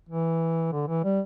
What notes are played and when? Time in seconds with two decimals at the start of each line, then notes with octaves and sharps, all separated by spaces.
0.09 E3
0.73 D3
0.88 E3
1.04 G3